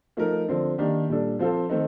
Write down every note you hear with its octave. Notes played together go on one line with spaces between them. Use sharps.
F3 A3 D#4 A#4
D3 F3 C4
D#3 A#3 D4 G4
A#2 G3 D4 A4
F3 C4 F4 A4 C5
D#3 A3 C4 D#4